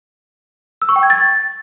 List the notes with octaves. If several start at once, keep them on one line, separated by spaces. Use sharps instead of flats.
E6
C#6
G5
G#6
A6